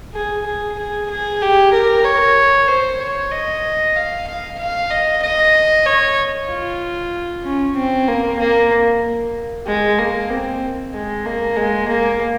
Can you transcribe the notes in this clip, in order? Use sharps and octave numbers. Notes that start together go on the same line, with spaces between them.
G#4
G#4
G#4
G#4
G4
A#4
C#5
C5
C#5
D#5
F5
F5
F5
D#5
D#5
C#5
F4
C#4
C4
A#3
A#3
G#3
A#3
C4
G#3
A#3
G#3
A#3